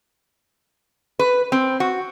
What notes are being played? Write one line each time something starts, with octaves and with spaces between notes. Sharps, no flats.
B4
C4
F#4